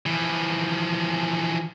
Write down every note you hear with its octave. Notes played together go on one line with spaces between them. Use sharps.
E3 F3